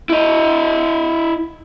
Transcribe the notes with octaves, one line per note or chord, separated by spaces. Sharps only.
E4 D#5